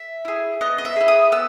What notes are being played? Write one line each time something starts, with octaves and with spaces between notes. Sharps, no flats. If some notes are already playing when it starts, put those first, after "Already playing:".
Already playing: E5
E4 G#4
B3 D#5
D#5
E5
E4 G#4
D#6
B3 E6